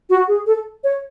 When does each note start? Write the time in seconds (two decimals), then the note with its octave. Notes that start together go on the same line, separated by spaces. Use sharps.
0.10 F#4
0.28 G#4
0.46 A4
0.84 C#5